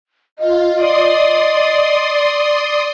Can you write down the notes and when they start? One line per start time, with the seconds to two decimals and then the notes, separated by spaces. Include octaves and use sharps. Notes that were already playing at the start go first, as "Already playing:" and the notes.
0.39 F4 D#5
0.75 D5 C6 D#6